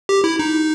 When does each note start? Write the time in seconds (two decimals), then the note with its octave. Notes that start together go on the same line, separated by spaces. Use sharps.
0.09 G4
0.24 E4
0.39 D#4